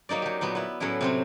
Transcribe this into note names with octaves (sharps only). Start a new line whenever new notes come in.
F#3 A#3 D#4 D5
F#3 G4
A#2 F#3 B3
B3 E4
A2 F#3 A3 C#4 E4
C3 F#3 C4